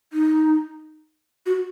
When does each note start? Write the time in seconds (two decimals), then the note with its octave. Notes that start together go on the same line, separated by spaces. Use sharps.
0.13 D#4
1.46 F#4